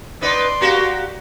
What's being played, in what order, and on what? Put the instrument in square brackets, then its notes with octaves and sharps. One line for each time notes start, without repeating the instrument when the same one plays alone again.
[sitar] B3 D#4 B4 [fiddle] D5 C6
[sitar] A#3 F#4 G4